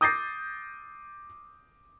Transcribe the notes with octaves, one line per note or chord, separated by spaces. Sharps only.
D6 D#6 G6 A6 A#6 C7